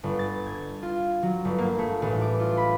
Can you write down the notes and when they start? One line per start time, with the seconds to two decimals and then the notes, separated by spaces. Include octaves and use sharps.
0.03 G1
0.19 A6
0.46 G#6
0.83 F4
1.23 F#3
1.45 G1
1.58 A#3
1.79 A3
2.02 A1
2.22 D6
2.40 F4
2.57 B5